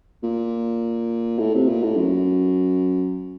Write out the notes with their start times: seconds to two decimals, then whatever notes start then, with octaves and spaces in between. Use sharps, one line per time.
0.23 A#2
1.39 A2
1.55 C3
1.68 A#2
1.83 A2
1.97 F#2